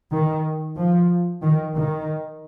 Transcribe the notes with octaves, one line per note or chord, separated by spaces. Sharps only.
D#3
F3
D#3
D#3